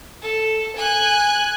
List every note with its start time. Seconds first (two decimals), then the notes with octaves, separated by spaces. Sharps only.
0.22 A4
0.77 G#5 F#6